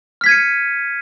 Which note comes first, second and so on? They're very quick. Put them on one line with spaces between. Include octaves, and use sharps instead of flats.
F6 B6 G#6 D#7 C#7